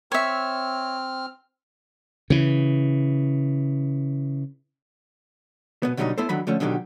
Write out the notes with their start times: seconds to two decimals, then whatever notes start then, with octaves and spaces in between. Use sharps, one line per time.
0.12 C4 C#5 E5 F6
2.30 C#3 E3
5.83 B2 B3
5.97 B2 D3 F#3 G3 D4 D#4
6.18 B3 E4 A4 C5
6.29 D3 D#3 F#3 B5
6.47 D3 F3 A3 C#4
6.60 B2 D3 D#3 F#3 G4